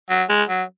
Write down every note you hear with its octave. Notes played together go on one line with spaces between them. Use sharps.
F#3
G#3
F#3